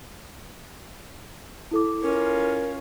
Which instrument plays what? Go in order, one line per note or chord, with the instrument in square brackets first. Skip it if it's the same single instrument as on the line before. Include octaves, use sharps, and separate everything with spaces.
[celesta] E4 A4 D6
[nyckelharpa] C#4 F4 [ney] A#4